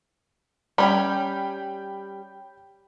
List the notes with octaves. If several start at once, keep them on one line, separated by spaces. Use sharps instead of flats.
G3 C#4 G5 B5